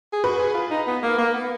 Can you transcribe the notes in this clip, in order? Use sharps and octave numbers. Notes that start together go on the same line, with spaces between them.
G#4
F#4 B4
G#4
F4
D#4
B3
A#3
A#3
B3